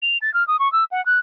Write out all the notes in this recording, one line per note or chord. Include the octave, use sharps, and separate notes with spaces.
F7
A6
F6
D#6
C#6
E6
F#5
F#6